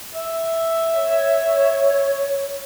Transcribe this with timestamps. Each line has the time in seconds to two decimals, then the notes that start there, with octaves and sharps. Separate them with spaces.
0.15 E5
0.93 C#5